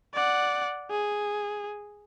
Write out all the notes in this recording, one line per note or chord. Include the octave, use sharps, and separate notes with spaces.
D5 F#5
G#4